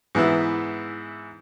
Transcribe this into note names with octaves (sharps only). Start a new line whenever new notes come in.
G#2 E3 B3 E4